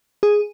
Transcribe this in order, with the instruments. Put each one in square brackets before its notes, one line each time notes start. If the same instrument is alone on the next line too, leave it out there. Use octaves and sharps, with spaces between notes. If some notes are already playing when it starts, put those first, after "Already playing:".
[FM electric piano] G#4